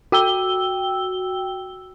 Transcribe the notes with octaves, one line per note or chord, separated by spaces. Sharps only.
F#4 G5 E6 G7